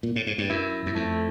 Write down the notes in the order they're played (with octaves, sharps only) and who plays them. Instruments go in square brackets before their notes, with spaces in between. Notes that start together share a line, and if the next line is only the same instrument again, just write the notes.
[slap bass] A#2
A2
G#2
G2
[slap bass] F#2 [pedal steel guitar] E4
[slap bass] F#2
[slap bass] F2 [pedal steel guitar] A3